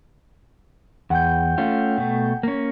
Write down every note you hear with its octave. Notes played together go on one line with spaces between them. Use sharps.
E2 F#5 G5 G6
A3 C#4 F4
B2 A3
A#3 C#4